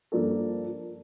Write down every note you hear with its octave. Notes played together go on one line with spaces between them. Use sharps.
G2 F3 A#3 D4 A4